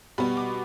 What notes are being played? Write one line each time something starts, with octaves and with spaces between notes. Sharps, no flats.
B2 G3 B3 B5
D6